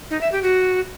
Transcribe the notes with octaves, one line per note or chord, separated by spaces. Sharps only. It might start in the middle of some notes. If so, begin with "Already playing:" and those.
D#4
E5
G4
F#4